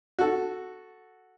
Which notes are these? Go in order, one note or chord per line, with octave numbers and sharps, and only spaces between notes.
F#4 A4